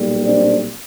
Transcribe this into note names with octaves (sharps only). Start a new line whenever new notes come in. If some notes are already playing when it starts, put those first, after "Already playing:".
Already playing: B1 A#2 G3
C4 D4